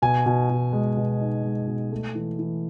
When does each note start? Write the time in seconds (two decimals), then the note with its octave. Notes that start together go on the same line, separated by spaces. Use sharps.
0.02 B2 G#5
0.26 B2
0.50 B2
0.73 G#3
0.97 B2
1.21 D#4
1.44 G#3
1.67 B2
1.92 A3
2.15 E3
2.39 E3